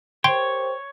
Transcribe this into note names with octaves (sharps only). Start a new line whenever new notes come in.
G4 A#4 C5 C#5 G5 C6